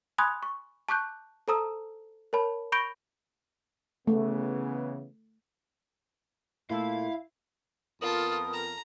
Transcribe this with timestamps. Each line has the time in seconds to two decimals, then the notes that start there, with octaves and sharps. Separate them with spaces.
0.18 G#5 B5 C6 D#6 F#6 G#6
0.43 C#6
0.89 A5 C#6 D6 F#6 G6
1.48 A4 C5 A5 A#5 D#6 E6
2.33 A#4 C#5 A5 B5
2.72 B5 C#6 G6 A#6 D7 G7
4.07 C#3 E3 A3 B3
6.70 A#2 A3 E4 A4 F5
8.01 F2 B3 F4 A4 A#4 D#6
8.54 A#5